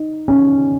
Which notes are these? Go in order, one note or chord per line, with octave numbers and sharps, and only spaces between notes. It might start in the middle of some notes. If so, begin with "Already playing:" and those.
Already playing: D#4
C#4